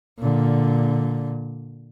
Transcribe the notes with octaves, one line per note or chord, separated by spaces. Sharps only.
A#2 D3